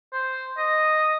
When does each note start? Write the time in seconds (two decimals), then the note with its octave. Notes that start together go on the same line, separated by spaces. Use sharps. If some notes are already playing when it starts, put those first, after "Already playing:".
0.13 C5
0.58 D#5